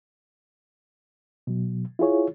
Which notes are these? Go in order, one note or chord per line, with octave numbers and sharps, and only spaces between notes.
B2 F#3
E4 F4 G#4 C#5